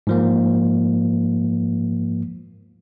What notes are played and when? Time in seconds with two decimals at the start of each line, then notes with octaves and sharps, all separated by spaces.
0.07 G#2 F3 A#3